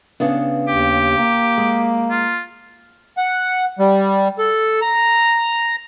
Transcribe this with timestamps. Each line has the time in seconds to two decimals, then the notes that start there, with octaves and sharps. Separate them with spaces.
0.20 C#3 B3 D4
0.68 D#2 G4
1.17 A#3
1.58 G#3
2.11 F4
3.17 F#5
3.79 G3
4.38 A4
4.82 A#5